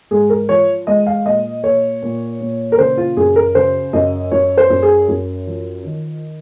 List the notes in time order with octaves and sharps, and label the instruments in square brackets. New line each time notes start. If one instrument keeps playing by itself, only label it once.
[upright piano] G#2 G#4
A#4
F3 C#5
G#3 D#5
F5
A#2 D#5
A#2 C#5
A#2
A#2
A#4
C#3 C5
F4
F#2 G#4
A#4
C#3 C5
F#2 D#5
F#2 C#5
C5
F#2
G#4
F#2
F3
D#3